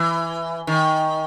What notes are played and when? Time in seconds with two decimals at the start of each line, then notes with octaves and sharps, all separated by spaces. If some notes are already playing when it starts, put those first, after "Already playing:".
Already playing: E3
0.67 D#3